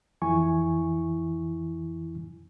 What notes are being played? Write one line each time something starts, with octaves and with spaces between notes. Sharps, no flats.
F2 E3 E4 G#5 C#6